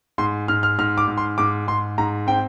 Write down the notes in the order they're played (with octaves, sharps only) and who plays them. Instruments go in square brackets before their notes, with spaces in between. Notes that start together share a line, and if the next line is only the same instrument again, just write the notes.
[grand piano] G#2 C6
G#2 F6
F6
G#2 F6
D6
G#2
C6
G#2 D6
G#2 C6
G#2 A#5
C4 G5